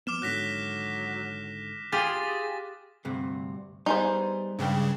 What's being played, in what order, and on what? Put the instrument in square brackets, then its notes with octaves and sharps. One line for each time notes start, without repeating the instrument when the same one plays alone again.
[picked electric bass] F3 B3 [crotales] D6 F6 E7
[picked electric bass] G#1 G#2 D3 [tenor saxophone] F#3 [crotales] F#6 A#6 B6
[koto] F4 G4 [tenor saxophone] G#4 [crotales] A6
[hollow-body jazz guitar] D2 G2 C3
[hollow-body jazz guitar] G3 B3 [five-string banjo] D#4 G#4 C5
[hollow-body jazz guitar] C#2 G3 G5 [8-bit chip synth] G2 C#3